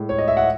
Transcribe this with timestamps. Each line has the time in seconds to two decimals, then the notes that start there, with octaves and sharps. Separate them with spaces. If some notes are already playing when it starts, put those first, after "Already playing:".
Already playing: A2 G#3
0.09 C#5
0.18 D#5
0.28 E5
0.37 F#5